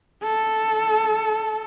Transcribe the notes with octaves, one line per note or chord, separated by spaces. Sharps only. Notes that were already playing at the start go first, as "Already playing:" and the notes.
A4